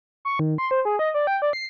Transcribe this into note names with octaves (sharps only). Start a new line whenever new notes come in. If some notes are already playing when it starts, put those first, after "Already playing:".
C#6
D#3
C6
C5
G#4
D#5
D5
G5
D5
C7